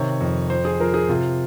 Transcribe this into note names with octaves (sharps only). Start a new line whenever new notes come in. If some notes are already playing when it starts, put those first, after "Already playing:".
Already playing: C3 D#3 C#5
F2
F3 C5
G#4
F3 A#4
G#4
C3 F4